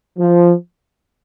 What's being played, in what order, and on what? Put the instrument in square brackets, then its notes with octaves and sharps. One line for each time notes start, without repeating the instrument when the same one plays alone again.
[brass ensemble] F3